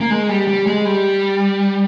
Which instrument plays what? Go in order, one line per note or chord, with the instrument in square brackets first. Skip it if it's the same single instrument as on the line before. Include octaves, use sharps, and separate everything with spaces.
[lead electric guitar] A#3
G#3
G3
G3
G#3
G3